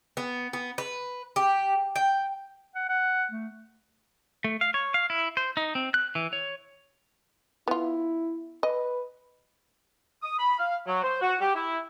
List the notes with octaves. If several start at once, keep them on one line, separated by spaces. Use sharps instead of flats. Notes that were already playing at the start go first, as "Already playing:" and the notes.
B3
B3
B4
G4
G5
F#5
F#5
A3
A3
F5
C#5
F5
E4
C5
D#4
C4
F#6
E3
C#5
B3 E4 F4
B4 D#5
D#6
B5
F5
F#3
C5
F#4
G4
E4